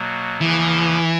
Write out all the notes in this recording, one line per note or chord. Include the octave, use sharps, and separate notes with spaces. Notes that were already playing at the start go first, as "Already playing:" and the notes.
Already playing: B2 F#3 A#3
E2 C#3 E3 F3 A#3